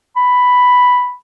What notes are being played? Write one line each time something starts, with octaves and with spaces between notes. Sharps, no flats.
B5